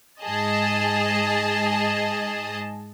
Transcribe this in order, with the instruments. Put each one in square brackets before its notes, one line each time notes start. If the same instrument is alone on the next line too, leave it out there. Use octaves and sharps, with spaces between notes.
[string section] G#2 G#4 D#5 A5